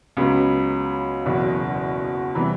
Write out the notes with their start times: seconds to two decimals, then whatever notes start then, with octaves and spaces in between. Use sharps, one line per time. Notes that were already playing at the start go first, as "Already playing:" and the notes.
0.17 C#2 C#3 F#3 B3
1.25 F#1 E2 B2
2.35 C3 E3 G3 B3